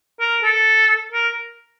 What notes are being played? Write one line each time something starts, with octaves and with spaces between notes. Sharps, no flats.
A#4
A4
A#4